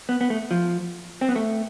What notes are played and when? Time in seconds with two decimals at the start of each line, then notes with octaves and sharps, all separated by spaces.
0.09 B3
0.21 B3
0.30 A3
0.51 F3
1.21 C4
1.29 B3
1.36 A3